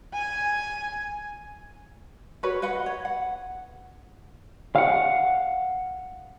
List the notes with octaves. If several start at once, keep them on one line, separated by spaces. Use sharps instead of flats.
G#5
F#4 A#4 B4 C#5
B4 D#5 F#5 B5
C#5
F#5
F5 F#5